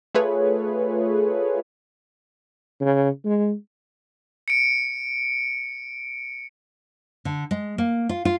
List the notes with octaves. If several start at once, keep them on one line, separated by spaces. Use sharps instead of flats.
A3 F4 G#4 B4 C#5
C#3
G#3
C#7 D7
D3
G#3
A#3
F4
F4